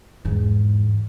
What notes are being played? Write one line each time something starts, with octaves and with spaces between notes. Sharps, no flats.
E2 G#2